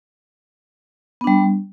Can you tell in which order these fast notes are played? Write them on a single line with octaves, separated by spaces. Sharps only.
B3 D4 G3